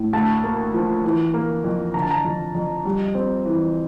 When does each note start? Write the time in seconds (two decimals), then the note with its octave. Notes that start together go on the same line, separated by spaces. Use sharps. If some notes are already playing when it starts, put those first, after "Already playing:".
Already playing: A2
0.13 D2 A5
0.43 A#3
0.74 F3
1.04 E3
1.34 A#3
1.64 F2
1.94 D3 A#5
2.02 A5
2.11 A#5
2.25 F2
2.55 F2
2.85 G3
3.15 C4
3.45 E3